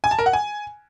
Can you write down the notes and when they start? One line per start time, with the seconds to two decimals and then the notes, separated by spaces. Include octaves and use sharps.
0.04 G#5
0.11 A5
0.19 A#4
0.26 F#5
0.33 G#5